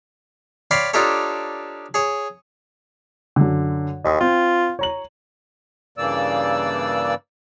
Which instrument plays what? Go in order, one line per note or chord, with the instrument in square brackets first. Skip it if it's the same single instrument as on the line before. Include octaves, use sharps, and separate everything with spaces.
[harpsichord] C#5 D5 F5 G5 B5 C6
D4 D#4 F4 G4 A4 C#5
G#4 C#5
[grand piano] F#2 D3
[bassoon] D#2 [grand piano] D#5 G5 D#6
[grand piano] C4 [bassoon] F4
[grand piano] C#5 A#5 F#7
[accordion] G2 C#3 E3 A#3 D5 E6